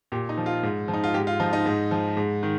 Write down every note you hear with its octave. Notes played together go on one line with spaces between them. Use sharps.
A#2 G4
D#4
F3
F4
G#2
F3
D#4
F4
G#2 G4
F4
F3 D#4
D#4
G#2
F3
G#2
D#3